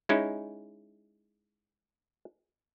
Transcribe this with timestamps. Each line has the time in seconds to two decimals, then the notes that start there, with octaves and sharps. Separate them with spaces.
0.09 G#3 C#4 D#4 E4